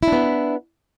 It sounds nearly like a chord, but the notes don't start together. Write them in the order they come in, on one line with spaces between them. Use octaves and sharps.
E4 D4 B3